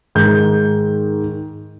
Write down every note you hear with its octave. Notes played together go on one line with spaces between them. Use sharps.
G#2 D#3 G6